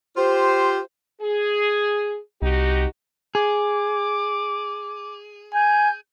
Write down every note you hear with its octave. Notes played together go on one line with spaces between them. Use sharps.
F4 G4 C5
G#4
C2 D#4 F#4 G4
G#4 D6
G#5 G6